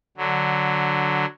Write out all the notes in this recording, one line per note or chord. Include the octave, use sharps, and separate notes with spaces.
D3 F#3